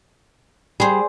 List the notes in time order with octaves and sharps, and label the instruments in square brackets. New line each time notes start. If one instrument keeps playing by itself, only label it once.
[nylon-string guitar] G3 [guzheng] G#4 C5